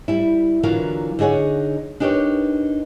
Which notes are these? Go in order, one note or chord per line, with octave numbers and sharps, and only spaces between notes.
G3 E4
D3 E3 F#3 F4 A#4 F5
D3 D#4 G#4 C#5 F#5
D4 D#4 G4 A#4 B4 C#5